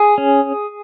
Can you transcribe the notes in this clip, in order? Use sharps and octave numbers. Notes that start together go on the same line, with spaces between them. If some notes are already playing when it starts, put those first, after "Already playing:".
Already playing: G#4
C#4